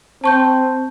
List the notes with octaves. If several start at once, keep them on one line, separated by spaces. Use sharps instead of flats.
C4 A5 C#6 G6